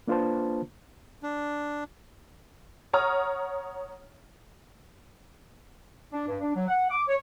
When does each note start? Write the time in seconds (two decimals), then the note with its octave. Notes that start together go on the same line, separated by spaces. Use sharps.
0.08 A#3 D4 F4 B4 C5 A5
1.23 D4
2.93 C#5 F#5 A#5 D#6 F6
6.11 D4
6.27 G2
6.39 D4
6.54 F#3
6.66 F#5
6.90 D6
7.08 C#5